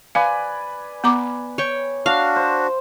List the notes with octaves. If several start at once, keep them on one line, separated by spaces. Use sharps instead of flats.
B4 D5 F5 G#5
B3 A#5 D6
C#5 G5
D4 F#4 F5
C5